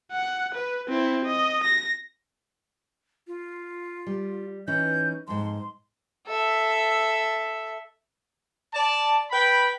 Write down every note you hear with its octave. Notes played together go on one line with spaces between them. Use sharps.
F#5
B4
C4 E4
D#5
A#6
F4
G3
E3 C#4 D#4 G6
F2 G#2 C6
A4 E5
D5 A5
B4 G5 B5